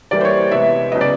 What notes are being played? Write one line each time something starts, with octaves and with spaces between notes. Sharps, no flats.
E3 G3 A#3 D5
C5
C#5
C3 E3 G#3 B3 E5
C#3 F#3 B3 D#5
D5